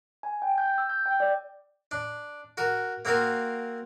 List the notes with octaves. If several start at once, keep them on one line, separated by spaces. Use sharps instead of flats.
G#5
G5
G6
E6
G6
G5
D5
D4
F#4 A#4
A#3 C4 F#4 A#4 F5